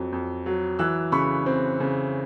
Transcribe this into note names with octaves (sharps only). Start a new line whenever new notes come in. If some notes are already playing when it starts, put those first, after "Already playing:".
Already playing: F2 F#3
F2
F#3
E3 E6 F#6
C#3 B5 C#6
C4
C#3